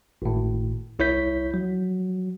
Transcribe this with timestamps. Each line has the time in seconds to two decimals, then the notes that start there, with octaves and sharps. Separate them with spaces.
0.22 G#1 A2
0.99 C2 E4 C#5 G6 B6
1.54 F#3